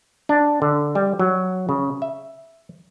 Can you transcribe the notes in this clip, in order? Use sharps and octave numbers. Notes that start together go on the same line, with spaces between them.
D4
D3
G3
F#3
C#3
E5